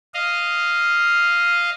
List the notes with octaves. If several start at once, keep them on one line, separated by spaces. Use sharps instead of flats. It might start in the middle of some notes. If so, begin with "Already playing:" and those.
D#5 F5